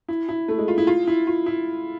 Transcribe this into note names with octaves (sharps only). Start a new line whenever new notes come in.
E4
E4
A3
G#3
F4
E4
F4
E4
F4
E4